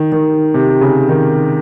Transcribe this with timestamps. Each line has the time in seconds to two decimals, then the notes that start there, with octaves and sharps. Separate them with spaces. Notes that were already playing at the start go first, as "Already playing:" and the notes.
Already playing: D#3
0.12 D#3
0.54 C3
0.81 C#3
1.09 D#3